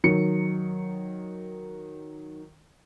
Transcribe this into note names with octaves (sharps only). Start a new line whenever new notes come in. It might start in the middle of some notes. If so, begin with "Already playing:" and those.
D#3 F#3 C#7